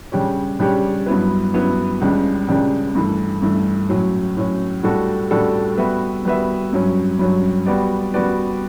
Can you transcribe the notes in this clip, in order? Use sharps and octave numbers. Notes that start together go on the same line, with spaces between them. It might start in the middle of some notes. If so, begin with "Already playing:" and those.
C#3 G3 D4 G4 C#5
C#3 G3 D4 G4 C#5
G2 F#3 B3 E4 B4
G2 F#3 B3 E4 B4
C#2 C#3 G3 D4 G4
C#2 C#3 G3 D4 G4
G2 E3 A3
G2 E3 A3
A2 F#3 C#4
A2 F#3 C#4
A2 G3 D4 F#4 A4
A2 G3 D4 F#4 A4
G3 B3 F#4 B4 E5
G3 B3 F#4 B4 E5
G2 F#3 C#4
G2 F#3 C#4
G3 B3 F#4 B4 D5
G3 B3 F#4 B4 D5